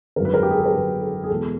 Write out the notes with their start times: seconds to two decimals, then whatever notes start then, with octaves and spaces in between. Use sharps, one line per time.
0.16 G#1 F#2 D3 A#4
0.25 B4
0.34 A#4
0.43 G4
0.51 G#4
0.58 A4
0.66 A#4
0.73 G#1 F#2 D3 B4
1.01 A4
1.24 G#4
1.30 E2 B2 G#3 A4